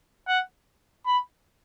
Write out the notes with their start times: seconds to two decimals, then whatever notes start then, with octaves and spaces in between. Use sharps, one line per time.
0.28 F#5
1.06 B5